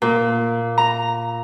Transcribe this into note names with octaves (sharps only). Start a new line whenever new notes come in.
A#2
A#5